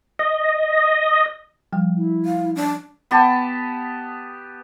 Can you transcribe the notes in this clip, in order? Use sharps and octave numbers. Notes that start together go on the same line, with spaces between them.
D#5
F3 G3 G5
E4
F5
D4
B3 G4 A5